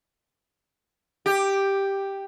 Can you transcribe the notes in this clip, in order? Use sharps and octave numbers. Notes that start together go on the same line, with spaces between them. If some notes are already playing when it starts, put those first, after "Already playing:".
G4